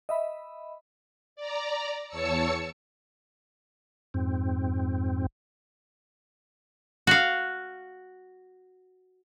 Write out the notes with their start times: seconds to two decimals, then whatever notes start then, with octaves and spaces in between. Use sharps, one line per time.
0.09 D#5 E5 B5
1.36 D5 A#5
2.08 E2 C#5 A5 E6 C#7
4.14 F2 G#2 C4
7.07 F#4 F5